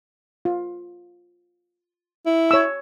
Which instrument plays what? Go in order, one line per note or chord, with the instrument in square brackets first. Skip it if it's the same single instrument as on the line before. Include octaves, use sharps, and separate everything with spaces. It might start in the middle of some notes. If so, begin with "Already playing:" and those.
[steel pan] F4
[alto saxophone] E4
[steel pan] C#5 E6